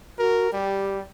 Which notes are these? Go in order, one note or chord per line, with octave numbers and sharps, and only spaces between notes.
F#4 A#4
G3 G4